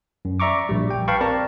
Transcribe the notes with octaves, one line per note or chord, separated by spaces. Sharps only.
F#2
D5 E5 A#5 C#6 D6
A#1 G3
G5
B4 F5 G5 A5 B5 C#6
C4 A#4 D5 A5 A#5